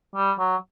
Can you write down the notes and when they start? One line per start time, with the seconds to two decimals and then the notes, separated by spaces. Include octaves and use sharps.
0.15 G3
0.39 F#3